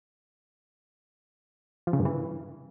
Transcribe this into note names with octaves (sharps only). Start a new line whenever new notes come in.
F3
C#3
G2
E3